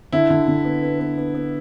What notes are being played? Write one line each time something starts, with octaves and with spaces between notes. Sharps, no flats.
D3 E4
D3
D3
B3
B3
B3
B3
B3